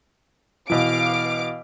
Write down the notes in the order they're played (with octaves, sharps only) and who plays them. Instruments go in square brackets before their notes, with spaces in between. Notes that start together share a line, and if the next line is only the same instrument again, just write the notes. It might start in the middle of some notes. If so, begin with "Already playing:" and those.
[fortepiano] B2 E3 [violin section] F5 D6 D7